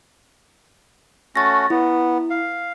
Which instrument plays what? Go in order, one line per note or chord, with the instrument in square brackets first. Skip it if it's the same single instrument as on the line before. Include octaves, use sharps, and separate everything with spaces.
[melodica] A3 C#4 F#4 [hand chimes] A6 A#6
[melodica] B3 [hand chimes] E4
[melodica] F5